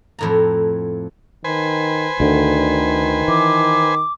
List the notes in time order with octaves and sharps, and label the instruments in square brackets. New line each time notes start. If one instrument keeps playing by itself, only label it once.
[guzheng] F2 A2 A#5
[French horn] D#3 [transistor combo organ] B4 C5 G#5
[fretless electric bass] D2 D3 [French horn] D#3
[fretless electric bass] E3 [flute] D6